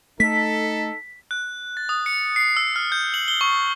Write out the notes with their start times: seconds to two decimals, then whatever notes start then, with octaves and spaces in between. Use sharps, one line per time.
0.20 A3 D#4 A4 B6
1.31 F#6
1.77 A6
1.89 D#6
2.06 C#7
2.36 C7
2.57 E6
2.76 F6
2.92 G6
3.14 F#7
3.28 G7
3.41 C#6